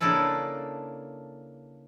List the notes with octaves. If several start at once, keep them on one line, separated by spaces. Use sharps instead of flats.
C#3 A#3 D4 E4 A4 B4